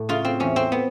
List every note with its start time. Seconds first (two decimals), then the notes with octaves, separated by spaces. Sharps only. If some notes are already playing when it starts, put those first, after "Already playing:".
Already playing: A2
0.09 C#3 F4
0.25 C4
0.40 E2 C#4
0.56 C4
0.72 B3